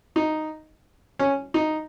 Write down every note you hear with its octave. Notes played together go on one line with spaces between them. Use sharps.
D#4
C#4
D#4